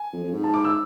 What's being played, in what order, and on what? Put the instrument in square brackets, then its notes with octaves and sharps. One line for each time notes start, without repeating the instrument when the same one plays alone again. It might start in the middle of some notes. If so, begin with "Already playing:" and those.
Already playing: [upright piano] G#5
[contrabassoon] F2
F2
G#2
[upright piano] A5
D6
E6